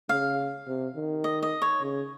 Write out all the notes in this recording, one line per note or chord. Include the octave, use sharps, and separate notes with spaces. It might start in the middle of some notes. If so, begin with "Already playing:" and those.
C#3 F5
C3
D#3
D#5
D#5
C#5
C#3